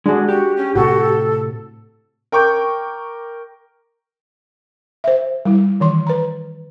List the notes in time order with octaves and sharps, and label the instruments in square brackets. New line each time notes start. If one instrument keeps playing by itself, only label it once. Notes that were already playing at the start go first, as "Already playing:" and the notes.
[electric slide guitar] G#3 F#4 [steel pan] D4 G#4
[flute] F#4 [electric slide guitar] G4
[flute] C#4
[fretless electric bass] A2 C3 [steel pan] F#4 [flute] A4
[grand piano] A#4 G5 C#6 D6 G6
[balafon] C5 E5
G3 E4
D#3 E3 C6
B4 A#5